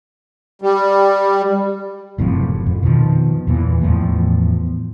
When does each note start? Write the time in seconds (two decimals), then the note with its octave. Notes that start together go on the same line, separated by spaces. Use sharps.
0.62 G3
2.18 F#1 A2 C3 F3
2.66 F2
2.83 B2 D#3 F3
3.47 E2 A#2 E3
3.82 E2 A2 F3